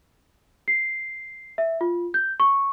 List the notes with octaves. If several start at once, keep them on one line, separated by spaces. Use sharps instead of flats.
C7
E5
F4
G6
C#6